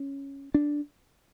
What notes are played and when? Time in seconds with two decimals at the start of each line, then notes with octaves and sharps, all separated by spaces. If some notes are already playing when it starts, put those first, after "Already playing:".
Already playing: C#4
0.54 D4